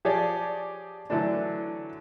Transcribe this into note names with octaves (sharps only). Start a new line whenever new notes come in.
F3 G4 G#4 C#5 D5
D3 E3 F#3 A3 D4